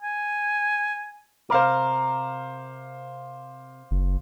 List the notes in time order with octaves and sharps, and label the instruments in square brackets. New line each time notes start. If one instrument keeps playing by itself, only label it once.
[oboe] G#5
[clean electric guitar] C3 A#4 [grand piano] C5 F5 D6
[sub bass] F#1